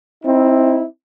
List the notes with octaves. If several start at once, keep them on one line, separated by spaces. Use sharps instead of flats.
C4 D#4 E4